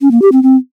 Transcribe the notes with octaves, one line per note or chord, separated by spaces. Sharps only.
C#4
A#3
G4
C4
C4